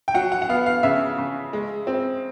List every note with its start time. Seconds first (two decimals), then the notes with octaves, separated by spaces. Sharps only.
0.08 G5
0.14 F#3 F#5
0.32 F#5
0.42 F#5
0.49 B3 F5
0.66 F5
0.83 C#3 E5
1.18 C#3
1.53 G#3
1.87 C4